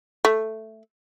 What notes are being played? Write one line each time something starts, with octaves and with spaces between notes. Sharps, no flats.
A3